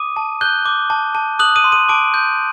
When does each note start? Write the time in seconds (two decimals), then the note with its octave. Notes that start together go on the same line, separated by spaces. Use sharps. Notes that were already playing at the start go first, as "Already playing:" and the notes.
Already playing: D6 D#6 D#7
0.16 A5
0.41 F#6 G6 G7
0.66 D6
0.90 A5
1.15 A5
1.39 D#6 F#6 F#7
1.56 D#6 D#7
1.64 C6
1.72 D#6 D#7
1.89 A5 D6 D7
2.14 G6